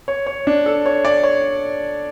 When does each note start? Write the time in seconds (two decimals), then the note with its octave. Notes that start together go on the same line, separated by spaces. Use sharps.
0.08 C#5
0.27 C#5
0.47 D4
0.66 A4
0.86 C#5
1.05 D5
1.24 C#5